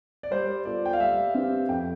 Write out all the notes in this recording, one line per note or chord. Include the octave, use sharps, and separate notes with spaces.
D5
G3 C5
B3 F4 A4 C5 D5
G5
F5
G3 E5
C4 G4 B4 F5
F2 G5